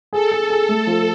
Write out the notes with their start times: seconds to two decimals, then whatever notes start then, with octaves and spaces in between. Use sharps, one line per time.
0.12 G#4 A4
0.31 G#4
0.50 G#4
0.69 A3
0.87 F3